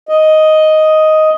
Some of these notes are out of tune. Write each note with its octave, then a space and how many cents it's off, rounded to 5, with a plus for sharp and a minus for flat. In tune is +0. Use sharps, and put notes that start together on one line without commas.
D#5 +5